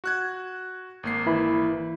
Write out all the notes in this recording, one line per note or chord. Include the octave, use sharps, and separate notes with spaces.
F#4 F#6 G#6
G#1 A#3 C7
E3 E4 B5